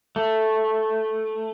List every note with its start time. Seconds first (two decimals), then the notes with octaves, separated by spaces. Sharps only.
0.16 A3